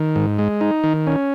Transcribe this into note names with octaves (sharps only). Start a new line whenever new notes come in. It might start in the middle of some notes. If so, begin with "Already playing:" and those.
Already playing: D#3
G#2
G#3
D#4
D#3
C#4